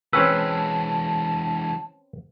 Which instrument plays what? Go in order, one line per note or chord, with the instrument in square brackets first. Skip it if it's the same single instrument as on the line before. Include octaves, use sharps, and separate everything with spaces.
[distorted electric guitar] E3 G#3 [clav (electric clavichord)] C4 C#4 B4 [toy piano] G5 E6 [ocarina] A5